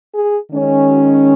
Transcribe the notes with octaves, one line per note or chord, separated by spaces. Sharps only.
G#4
D#3 G#3 C#4
F#4